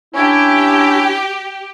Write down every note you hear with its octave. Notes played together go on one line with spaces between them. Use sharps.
C#4 D4 E4 G4